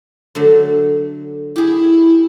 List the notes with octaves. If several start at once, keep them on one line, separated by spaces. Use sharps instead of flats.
D3 F#3 A3
E4 G4 G#4